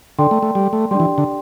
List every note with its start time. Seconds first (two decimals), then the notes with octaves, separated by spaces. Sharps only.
0.19 D3 A4 D5 G5 C6
0.31 A3
0.42 A3
0.55 G3
0.73 A3
0.91 G3 D4 G4 D5 G5 C6
1.00 E3
1.18 D3